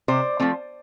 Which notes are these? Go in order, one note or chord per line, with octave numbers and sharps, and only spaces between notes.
C3 C5 D5
F3 A3 C4